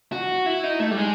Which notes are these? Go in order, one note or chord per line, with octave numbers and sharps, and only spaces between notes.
F#4
E4
D#4
A3
G3
G#3